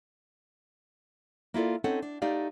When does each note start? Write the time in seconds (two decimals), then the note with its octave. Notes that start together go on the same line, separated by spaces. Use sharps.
1.54 A#3 E4 F4 A4 D5
1.84 C4 C#4 D#4 A4 F#5
2.02 D4
2.22 A3 D#4 G4 D5 F5